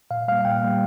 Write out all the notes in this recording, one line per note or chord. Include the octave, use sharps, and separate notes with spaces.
A#2 F5
G3 A#3 F5
A#2 G5
G3 A#3